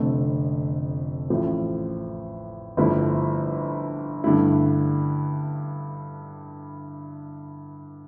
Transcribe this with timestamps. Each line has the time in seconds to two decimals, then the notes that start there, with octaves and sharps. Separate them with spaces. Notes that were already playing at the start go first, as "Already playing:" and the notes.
Already playing: F1 F2 D3 A3
1.30 A1 A2 F3
2.77 G1 G2 F3 A3 E4
4.24 G2 D3 A3 E4